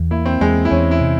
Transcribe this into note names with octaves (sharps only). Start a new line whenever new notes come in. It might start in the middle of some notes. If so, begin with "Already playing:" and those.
Already playing: E2
A#3 E4
C4
E2 G#3
E4
E2 C#4
E4
C3